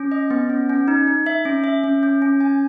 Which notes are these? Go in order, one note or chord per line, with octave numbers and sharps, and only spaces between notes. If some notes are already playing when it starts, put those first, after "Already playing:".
Already playing: C#4
D#5
B3
C#4
C#4
D#4
D#4
E5
C#4
E5
C#4
C#4
C#4
G#5